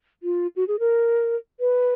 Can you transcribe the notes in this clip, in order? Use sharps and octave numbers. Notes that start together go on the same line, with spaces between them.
F4
F#4
G#4
A#4
B4